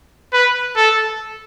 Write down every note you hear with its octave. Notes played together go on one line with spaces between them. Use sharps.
B4
A4